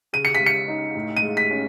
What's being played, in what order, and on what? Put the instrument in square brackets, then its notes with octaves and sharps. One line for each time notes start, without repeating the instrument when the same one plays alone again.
[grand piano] C#3 [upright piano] D#7
[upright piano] C#7
B6
[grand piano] G#3
[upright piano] C#7
[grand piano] D#4
A2
[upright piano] D#7
[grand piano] G#3
[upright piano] B6
[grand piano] C#4